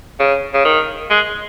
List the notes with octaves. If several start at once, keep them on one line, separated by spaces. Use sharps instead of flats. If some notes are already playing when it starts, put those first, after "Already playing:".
C#3
C#3
D#3
G#3